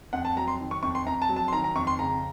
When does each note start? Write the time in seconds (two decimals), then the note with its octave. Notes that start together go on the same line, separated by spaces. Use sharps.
0.13 F2 F#5
0.25 A5
0.36 F#3 A#5
0.48 C6
0.60 D#3
0.71 C#6
0.83 F2 C#6
0.95 C6
1.06 F2 A#5
1.22 A5
1.29 F#3
1.36 A5
1.48 C6
1.52 D#3 A#5
1.64 A#5
1.75 F2 C#6
1.87 C6
1.99 C#3 A#5